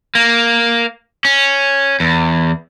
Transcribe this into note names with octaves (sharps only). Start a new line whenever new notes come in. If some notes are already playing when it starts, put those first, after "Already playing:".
A#3
C#4
E2